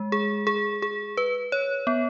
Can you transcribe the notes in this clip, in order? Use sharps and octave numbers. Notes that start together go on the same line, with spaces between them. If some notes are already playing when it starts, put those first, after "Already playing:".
Already playing: G#3
G#4
G#4
G#4
B4
C#5
B3